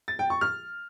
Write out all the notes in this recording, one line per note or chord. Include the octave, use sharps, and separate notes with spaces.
A6
G5
C#6
F6